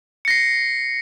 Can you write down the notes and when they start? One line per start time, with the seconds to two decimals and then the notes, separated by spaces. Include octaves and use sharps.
0.25 C#7
0.28 A#6
0.30 C7